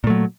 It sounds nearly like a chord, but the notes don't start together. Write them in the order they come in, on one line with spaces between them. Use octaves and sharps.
A#2 A3 F#3